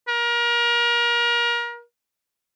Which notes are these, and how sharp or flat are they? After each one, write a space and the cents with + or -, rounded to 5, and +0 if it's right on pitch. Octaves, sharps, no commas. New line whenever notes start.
A#4 +30